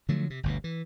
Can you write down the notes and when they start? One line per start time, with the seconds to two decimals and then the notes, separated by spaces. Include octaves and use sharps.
0.08 D3 F3 F#3 A3
0.30 C3
0.43 G1 D2 B2
0.64 E3